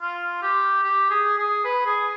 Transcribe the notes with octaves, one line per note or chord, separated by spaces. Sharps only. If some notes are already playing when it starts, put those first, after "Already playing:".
F4
G4
G4
G#4
G#4
B4
G#4